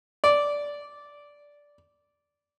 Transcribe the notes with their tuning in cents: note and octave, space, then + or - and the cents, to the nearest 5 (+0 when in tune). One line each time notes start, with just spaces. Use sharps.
D5 -10